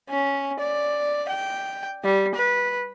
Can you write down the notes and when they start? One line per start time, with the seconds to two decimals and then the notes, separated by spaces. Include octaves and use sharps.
0.10 C#4
0.60 D5
1.29 G5
2.04 G3
2.35 B4